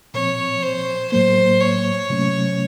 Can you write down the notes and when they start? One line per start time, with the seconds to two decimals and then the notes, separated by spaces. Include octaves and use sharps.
0.14 A#2 F3 C4 C#5
0.63 C5
1.12 A2 F#3 A#3 C5
1.61 C#5
2.10 C3 F#3 A3 C#4